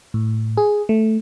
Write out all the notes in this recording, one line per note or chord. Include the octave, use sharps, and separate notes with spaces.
A2
G#4
A3